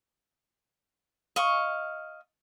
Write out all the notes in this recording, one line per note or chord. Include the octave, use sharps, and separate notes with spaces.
D#5 F5 C#6